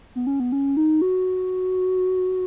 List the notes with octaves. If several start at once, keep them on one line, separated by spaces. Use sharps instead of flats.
B3
C#4
B3
C#4
D#4
F#4